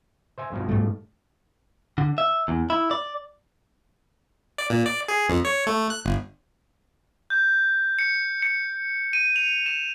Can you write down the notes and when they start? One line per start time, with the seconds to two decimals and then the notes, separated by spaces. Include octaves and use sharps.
0.38 C5 E5 G#5
0.52 G2 B2 F3
0.69 G#2 G3 A3
1.98 D3
2.18 E5
2.48 E2
2.70 E4
2.91 D5
4.58 D5
4.70 A#2
4.86 D5
5.08 G#4
5.29 F2
5.45 C#5
5.67 A3
5.90 F#6
6.05 G1
7.30 G6
7.99 C#7
8.42 C#7
9.13 D#7
9.36 F7
9.66 E7